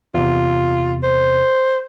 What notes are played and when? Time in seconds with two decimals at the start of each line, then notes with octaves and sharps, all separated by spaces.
0.14 E2 C3 F4
1.03 C5